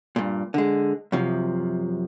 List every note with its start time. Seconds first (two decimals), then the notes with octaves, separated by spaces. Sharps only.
0.16 G2 A#2
0.54 D3 G#3
1.12 F#2 C3 F3